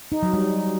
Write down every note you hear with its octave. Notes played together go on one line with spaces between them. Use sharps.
D#4
F#3
G3